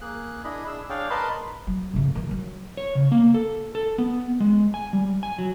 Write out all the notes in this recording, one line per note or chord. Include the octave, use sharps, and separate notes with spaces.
A#3 G#4 F#6
D4 E4 G#4 D#5 B5
D4 G#4 E6
D4 G#4 C#5 D5 F5 G5
A#4 B4 D#5 A5 B5 C6
F#3
F#2 C#3
D#3 E3
F#3
C#5
C#3
A#3
A4
A4
B3
G#3
G#5
G3
G#5
F#3